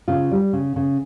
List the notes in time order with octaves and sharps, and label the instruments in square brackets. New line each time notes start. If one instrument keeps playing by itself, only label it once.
[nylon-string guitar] C#3 F4
G3
C#3
C#3